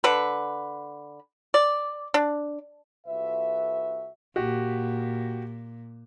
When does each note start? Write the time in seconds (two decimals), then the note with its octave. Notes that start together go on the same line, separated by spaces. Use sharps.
0.04 D3 B4
1.54 D5
2.14 D4
3.07 C2 F4 F#4 A4 B4 E5
4.36 A#2 F#4 G4